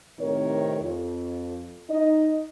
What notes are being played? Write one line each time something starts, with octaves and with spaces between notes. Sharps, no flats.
A2 C3 D#3 C4 A#4 C#5
F2
D#4 D#5